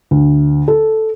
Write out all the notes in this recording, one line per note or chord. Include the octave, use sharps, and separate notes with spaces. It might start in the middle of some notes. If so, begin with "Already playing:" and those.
D2
A4